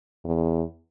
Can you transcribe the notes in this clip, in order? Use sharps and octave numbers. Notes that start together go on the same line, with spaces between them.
E2